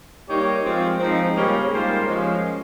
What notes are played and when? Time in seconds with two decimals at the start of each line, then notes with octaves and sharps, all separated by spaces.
0.28 G3 A#3 D#4 G4 C#5
0.64 F3 G#3 C4 F4
0.99 G#2 F3 C4 D#4
1.35 C#3 G3 A#3 C#4
1.71 G#2 G3 A#3 F4 C5
2.07 F3 G#3 C#4